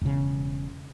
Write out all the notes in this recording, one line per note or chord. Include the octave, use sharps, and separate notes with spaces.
E1 C#3